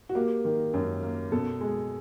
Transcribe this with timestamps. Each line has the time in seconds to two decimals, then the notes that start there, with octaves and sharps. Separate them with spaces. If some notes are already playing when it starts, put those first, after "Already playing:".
0.09 F#4
0.15 A#3 G4
0.45 D#3
0.74 F#2
1.03 A#3
1.32 B2 A4
1.61 G#3